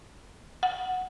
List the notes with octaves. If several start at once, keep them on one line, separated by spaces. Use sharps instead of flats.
F#5